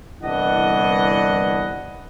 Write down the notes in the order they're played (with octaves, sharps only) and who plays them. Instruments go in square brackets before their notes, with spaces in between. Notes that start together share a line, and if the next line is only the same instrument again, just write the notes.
[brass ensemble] G1 C2 E3 D4 D#5 F#5